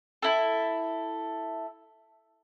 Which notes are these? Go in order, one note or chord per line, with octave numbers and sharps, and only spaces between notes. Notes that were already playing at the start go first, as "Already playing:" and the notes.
E4 A4